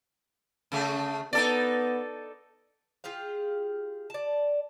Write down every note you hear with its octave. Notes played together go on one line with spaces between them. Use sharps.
C#3 A3 G#4
B3 D#4 A4 D5
F4 G4 G#4 F5
D5 A5